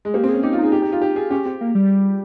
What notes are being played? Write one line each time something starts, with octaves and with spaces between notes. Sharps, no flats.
G#3
A#3 G4
C4
C#4 G#4
D#4 G4
F4
D#4 G#4
G4
G4
F4
G4
G#4
C#4 G4
C4 G4
A#3
G3